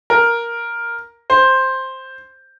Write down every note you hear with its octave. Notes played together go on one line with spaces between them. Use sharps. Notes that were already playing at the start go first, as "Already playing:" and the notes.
A#4
C5